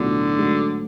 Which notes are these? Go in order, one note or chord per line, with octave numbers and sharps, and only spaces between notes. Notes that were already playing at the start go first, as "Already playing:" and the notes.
Already playing: B1 A2 D3 F#3 B3 F4
G#2 F#3 A3